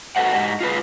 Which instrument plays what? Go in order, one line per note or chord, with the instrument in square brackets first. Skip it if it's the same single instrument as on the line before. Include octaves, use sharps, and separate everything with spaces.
[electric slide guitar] F#4 A4 B4 C5 D#5 F#5
G#2 G4 D#5
F4 G#4 B4